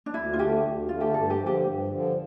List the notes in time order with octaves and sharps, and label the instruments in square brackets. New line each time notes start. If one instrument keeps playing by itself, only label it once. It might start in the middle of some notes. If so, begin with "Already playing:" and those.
[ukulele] D4
[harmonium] D2 [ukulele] E4
[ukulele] F4
[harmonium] D3 A3 [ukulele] G4
[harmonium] D2
[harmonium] D3 A3 [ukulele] F4
[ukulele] G4
[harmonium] G2 [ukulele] A4
[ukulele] G4
[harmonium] D3 F3
[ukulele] G4
[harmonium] G2
D3 F3